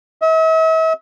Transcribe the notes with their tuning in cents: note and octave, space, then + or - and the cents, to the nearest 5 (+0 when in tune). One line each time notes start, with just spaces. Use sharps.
E5 -45